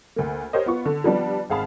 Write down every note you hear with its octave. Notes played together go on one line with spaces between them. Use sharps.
D2 A#3
G4 A#4 C5 C#5 D#5
B3 F4 C#6
D3
F3 G3 B3 D4
G#1 G#4 F5 A5 B5